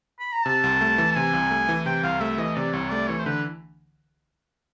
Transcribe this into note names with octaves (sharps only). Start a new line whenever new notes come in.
B5
A#5
C3 A5
C2
A3
E3
A5
C3 G#5
C2
A3
E3
C3 G5
C2 F5
A3 E5
E3 D#5
C3 D5
C2 C#5
A3 D5
E3 C#5
C5
D3 B4